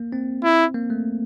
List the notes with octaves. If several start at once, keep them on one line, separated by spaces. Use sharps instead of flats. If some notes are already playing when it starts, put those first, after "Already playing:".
Already playing: A#3
C4
E4
A#3
A3